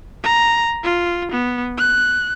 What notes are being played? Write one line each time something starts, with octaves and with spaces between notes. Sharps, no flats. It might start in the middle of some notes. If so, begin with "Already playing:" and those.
A#5
F4
B3
F#6